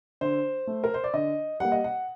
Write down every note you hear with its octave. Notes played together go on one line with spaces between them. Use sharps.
D3 C5
A3
A#4
C5
D5
D3 D#5
G3 A#3 F#5
D#5
F#5